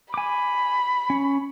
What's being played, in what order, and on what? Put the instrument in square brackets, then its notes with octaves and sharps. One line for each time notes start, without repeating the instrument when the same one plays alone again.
[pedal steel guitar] G#5 D6 [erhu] B5
[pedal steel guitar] C#4